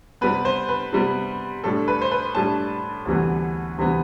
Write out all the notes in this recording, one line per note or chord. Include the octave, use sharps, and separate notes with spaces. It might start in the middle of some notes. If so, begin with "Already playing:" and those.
C3 G3 B3 B4
C5
B4
C3 G3 B3
A2 G3 D4 A4
B4
C5
B4
A2 G3 D4 A5
D2 C3 E3 G3 B3
D2 C3 E3 G3 B3